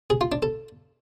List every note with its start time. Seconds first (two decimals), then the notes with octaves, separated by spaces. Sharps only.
0.10 G#4
0.21 F4
0.32 D4
0.42 A4